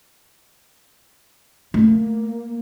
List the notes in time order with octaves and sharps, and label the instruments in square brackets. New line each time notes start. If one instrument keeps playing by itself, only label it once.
[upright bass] A3 [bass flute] A#3